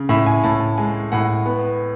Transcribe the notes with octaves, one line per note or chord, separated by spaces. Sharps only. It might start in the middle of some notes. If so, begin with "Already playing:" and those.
Already playing: C#3
A2 E5
G#5
A2 A5
G#3 G#5
A2 F#5
B3